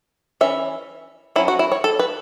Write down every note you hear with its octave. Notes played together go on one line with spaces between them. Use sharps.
E3 C#4 E5
F#3 C#4 E4
F#4
E4
C#5
A4
B4